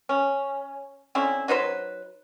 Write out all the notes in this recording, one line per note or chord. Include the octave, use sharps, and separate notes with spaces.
C#4
D3 C4 C#4 E4
F#3 D#4 B4 C5